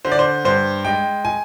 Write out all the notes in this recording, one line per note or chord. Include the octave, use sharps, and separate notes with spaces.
D3 C5
D5
C5
G2 C5
G#3 G5
G#5